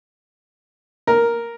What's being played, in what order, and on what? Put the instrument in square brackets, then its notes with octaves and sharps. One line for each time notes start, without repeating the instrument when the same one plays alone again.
[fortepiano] A#4